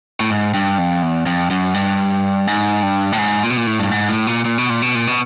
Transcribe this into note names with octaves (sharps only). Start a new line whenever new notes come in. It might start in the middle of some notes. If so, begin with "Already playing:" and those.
A2
G#2
G2
F2
E2
F2
F#2
G2
G#2
G2
A2
G#2
A#2
B2
A#2
A2
G2
G#2
A2
A#2
A#2
B2
A#2
B2
A#2
B2